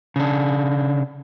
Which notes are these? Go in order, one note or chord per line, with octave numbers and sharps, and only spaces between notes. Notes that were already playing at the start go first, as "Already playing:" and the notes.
C#3 D4